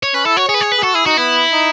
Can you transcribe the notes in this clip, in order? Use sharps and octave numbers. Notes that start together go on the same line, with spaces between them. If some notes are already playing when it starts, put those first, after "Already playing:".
C#5
C#4 B4
E4 A4
F#4 C#5
G#4 C#5
B4
C#5
B4
G#4
F#4 A4
E4 G#4
D#4 F#4
B3 E4
D#4